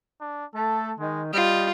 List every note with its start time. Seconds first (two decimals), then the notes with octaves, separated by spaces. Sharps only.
0.21 D4
0.55 A3 A4
0.99 D#3 G#3
1.33 G3 F4 D#5